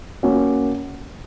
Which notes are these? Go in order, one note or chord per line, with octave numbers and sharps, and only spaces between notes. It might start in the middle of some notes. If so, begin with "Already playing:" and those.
A#3 C#4 F#4